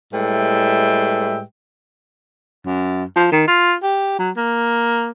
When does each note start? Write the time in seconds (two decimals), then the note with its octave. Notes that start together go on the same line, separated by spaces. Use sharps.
0.14 A2 G3 G#3 B4 E5 G5
2.65 F#2
3.16 F3
3.32 D#3
3.47 F4
3.83 G4
4.19 F#3
4.37 A#3